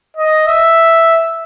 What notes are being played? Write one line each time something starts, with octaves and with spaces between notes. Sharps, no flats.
D#5
E5